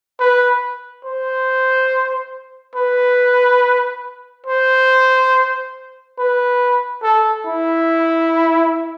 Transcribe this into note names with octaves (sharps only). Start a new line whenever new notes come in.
B4
C5
B4
C5
B4
A4
E4